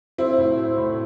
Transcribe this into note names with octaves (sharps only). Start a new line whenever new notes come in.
F#3 C4 E4
A2
F#3
A2